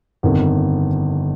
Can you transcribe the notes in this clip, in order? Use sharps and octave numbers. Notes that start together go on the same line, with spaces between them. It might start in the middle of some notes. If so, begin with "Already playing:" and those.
G1 F2 D#3